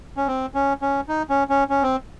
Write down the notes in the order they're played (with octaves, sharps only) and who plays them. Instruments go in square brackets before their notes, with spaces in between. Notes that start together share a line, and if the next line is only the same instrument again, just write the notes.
[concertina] C#4
C4
C#4
C#4
D#4
C#4
C#4
C#4
C4